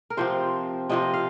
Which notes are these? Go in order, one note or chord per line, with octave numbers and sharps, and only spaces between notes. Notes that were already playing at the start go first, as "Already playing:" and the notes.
A#4
C3 F3 C4 C5
C3 F3 C4 D#5
F5